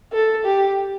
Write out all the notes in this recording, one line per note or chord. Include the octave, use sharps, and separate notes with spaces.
A4
G4